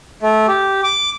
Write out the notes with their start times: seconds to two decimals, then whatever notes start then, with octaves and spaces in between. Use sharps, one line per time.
0.23 A3
0.48 G4
0.84 D6